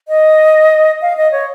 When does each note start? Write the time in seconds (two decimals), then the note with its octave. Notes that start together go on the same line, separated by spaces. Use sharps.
0.08 D#5
1.02 F5
1.17 D#5
1.32 C#5